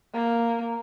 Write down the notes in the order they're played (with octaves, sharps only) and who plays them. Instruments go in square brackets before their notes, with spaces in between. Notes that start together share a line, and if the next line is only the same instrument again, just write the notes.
[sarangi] A#3